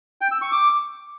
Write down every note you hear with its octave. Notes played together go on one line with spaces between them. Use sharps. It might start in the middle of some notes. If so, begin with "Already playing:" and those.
G5
E6
C#6
D6